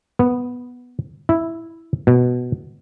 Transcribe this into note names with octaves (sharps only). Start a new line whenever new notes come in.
B3
E4
B2